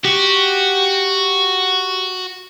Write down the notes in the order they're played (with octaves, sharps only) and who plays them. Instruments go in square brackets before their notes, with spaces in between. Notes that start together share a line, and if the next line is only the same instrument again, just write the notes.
[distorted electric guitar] F#4 [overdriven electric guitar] G4